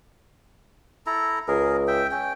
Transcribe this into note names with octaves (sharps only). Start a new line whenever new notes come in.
E4 A4 A#5
C#2 G#4 A#4
E5 G5
C#4 G5